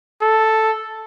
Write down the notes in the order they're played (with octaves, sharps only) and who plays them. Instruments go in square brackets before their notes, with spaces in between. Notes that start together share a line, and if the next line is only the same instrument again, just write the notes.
[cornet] A4